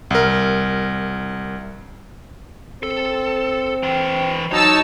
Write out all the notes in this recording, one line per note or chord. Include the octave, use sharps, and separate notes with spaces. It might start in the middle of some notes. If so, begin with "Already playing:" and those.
C2 A#4
C4 A4
E3 G5
F#3 D#4 C#5 A5 E6